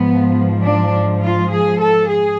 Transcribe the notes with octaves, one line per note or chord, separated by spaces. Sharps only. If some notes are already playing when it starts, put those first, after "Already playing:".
Already playing: G#2 F3 B3
D4
F4
G#4
A4
G#4